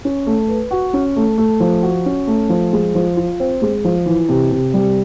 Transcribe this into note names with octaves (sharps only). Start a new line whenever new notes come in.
C#4
A3
B4
F#4
C#4
A3
A3
F3
F#4
C#4
A3
F3
G#3
F3
F4
C4
G#3
F3
E3
C3
C3
G3